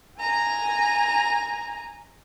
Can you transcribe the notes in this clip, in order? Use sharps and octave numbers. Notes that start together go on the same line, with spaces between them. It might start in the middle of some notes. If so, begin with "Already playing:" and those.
G#5 A#5